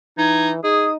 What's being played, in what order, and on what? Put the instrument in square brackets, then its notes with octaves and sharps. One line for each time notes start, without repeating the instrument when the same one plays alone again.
[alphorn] E3 [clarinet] D#4 [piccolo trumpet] G#6
[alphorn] D#4 [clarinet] G#4 [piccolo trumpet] D#6